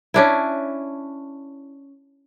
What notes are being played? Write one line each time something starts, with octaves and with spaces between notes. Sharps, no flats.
C#4 D4 E4